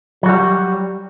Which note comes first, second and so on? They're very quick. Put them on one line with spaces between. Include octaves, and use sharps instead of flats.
F#3 F#4 G3